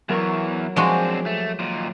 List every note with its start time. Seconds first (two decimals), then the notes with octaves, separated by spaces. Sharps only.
0.09 E2 E3 F#3 A#4 C#6
0.76 F3 G#3 C4 D4 F#4 C#5 G#5 D6
1.26 A3
1.59 D#2 A#2